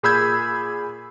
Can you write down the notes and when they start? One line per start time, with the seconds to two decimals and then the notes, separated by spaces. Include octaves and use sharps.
0.03 A#2 G#4 B5 E6 G6 G#6